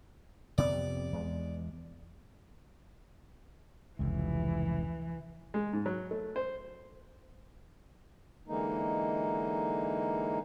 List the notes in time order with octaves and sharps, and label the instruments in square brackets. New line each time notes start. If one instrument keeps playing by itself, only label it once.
[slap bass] F2 C3 B3 [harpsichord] D5
[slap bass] E2 G#3
[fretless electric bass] F1 C#2 [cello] E3
[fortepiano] G#3
G#2
F#3
A3
C5
[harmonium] D3 E3 G#3 A#3 D#4